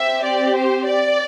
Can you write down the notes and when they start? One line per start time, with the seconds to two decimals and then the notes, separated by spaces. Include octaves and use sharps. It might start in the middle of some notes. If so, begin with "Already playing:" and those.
Already playing: C4 G4 E5
0.23 D5
0.55 C5
0.86 D5